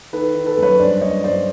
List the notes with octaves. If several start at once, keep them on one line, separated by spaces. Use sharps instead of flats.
D#3 A4 B4
D#3
A4 B4
F#2
B4 C#5
G2 C5 D5
G2 C#5 D#5
G2 C5 D5